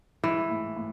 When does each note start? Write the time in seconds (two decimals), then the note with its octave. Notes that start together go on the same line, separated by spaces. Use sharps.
0.24 E3 G#3
0.50 A2
0.77 A2